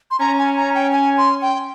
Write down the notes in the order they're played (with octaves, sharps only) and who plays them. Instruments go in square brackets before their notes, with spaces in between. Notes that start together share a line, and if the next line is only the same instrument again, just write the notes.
[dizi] C6
[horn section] C#4 [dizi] A#5
[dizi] G#5
A#5
G5
G#5
C6
G5